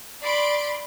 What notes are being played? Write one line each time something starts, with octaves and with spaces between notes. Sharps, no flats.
D5 B5 C6 D7